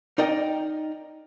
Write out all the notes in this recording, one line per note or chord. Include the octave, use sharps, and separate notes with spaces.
D#4 A#4 D5 D#5 G5